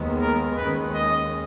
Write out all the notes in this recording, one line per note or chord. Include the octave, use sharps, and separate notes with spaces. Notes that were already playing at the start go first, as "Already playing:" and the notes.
Already playing: D#2 D#3 G#3 B3
A#4
D#2 D#3 G#3 C#4 B4
D#5